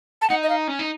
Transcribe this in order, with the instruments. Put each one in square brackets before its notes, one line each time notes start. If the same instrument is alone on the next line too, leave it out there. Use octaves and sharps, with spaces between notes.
[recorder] A5
[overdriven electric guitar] D#4 [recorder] F#5
[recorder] D#5
F5
[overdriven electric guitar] C#4
D#4